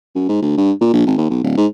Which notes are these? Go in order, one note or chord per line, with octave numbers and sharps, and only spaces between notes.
F#2
G#2
D2
G2
A#2
A#1
G#1
D#2
B1
D1
G#2